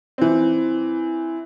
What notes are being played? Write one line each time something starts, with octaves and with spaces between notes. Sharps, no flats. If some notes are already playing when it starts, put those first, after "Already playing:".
E3 C4